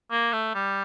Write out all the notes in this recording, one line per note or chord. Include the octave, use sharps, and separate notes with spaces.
A#3
A3
G3